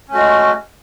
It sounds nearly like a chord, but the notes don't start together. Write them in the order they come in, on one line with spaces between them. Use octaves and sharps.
C#4 A3 F#4 G#3